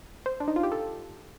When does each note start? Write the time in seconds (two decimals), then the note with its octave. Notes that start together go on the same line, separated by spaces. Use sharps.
0.26 C5
0.40 D4
0.48 D#4
0.56 F4
0.63 G4
0.72 A4